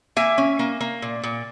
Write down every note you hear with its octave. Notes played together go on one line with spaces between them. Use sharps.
A#3 E5 G#5
C#4
A#3
A#3
A#2
A#2